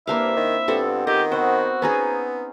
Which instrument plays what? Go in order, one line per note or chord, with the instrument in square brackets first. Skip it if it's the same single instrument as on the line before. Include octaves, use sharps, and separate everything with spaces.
[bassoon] G2 [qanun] A#3 D4 F5 [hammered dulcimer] C4 E4 [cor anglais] E5
[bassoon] D#3
[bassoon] G2 [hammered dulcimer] B3 F4 [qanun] C4 A4 D5
[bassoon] D#3 [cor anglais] G4 [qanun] D#5
[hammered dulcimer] B3 C4 F#5 [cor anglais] F#4 [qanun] C5
[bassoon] B3 [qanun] C#4 D#4 G#4 [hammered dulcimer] A#5